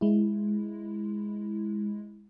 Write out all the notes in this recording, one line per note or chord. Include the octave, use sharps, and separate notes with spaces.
G#3 E4